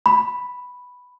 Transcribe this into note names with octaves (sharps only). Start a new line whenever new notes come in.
B5